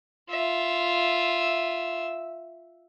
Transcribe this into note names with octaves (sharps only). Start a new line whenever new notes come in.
F4 E5